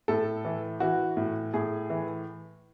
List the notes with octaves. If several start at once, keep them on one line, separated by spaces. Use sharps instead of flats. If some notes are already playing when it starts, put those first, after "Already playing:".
A2 A4
E3
E3 F#4
A2
A2 G#4
E3